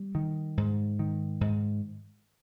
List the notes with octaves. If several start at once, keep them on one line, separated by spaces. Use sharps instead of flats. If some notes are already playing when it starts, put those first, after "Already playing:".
Already playing: G3
D#3
G#2
D#3
G#2